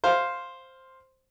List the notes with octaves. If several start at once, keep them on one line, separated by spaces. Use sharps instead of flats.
C5 F5